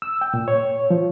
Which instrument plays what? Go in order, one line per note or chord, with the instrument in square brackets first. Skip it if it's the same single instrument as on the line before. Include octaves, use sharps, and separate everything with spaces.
[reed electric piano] E6
G5
A#2
C#5
F3